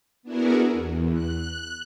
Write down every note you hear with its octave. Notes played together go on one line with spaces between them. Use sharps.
B3 D4 E4 F#4 G#4 A#4
E2
F#6